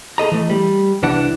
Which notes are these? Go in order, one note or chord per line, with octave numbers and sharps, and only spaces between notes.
G#4 A4 D#5 A#5
E3 A3
G3
C2 E3 D4 F#5